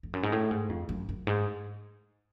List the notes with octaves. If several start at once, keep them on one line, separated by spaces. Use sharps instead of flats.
F2
F#2
G#2
A2
G#2
F2
F#2
F#2
G#2